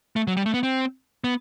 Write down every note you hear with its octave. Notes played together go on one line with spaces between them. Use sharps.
A3
F#3
G3
A3
B3
C4
B3